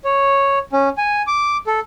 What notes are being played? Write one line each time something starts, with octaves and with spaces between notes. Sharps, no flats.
C#5
C#4
G#5
D6
A4